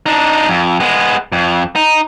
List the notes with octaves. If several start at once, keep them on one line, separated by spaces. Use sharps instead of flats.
D4 D#4
F2
G#3 B3
F2
D#4